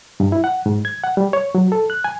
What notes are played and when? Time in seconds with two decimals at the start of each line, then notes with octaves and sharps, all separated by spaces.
0.20 G2
0.32 E4
0.44 F#5
0.66 G#2
0.85 G#6
1.03 F#5
1.17 G3
1.33 C#5
1.55 F#3
1.72 A4
1.90 F#6
2.04 G#5